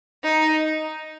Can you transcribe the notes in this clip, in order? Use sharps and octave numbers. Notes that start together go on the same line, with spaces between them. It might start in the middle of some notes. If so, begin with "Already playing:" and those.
D#4